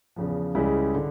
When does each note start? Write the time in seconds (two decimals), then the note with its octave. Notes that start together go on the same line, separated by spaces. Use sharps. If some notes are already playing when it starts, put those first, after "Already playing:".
0.16 E2 C#3 F3
0.55 C#2 C#3 G3 C#4 E4
0.95 D3